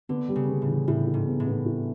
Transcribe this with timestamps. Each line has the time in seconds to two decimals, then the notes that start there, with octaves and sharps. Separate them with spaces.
0.09 D3 B3
0.29 G3
0.36 C#3
0.49 B3
0.62 A2
0.67 E3
0.88 A2 E4
1.07 E4
1.14 G#2
1.27 B3
1.40 A2
1.46 B3
1.66 E4